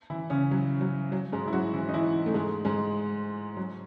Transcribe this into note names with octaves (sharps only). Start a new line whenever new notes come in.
E3 E4
C#3 C#4
F#3
F#3
F#3
G#2 G#3
E4
F#3 F#4
E3 E4
D#4
E3 E4
A3
G#2 G#3
G#2 G#3
F#3